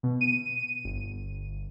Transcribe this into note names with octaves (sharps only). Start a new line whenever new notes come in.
B2
D#7
G1